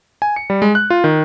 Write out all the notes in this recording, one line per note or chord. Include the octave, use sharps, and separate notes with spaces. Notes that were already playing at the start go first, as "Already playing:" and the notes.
G#5
C#7
G3
G#3
F#6
F4
D#3